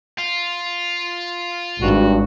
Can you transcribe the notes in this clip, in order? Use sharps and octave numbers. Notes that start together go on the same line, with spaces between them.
F4
G#1 G2 F#4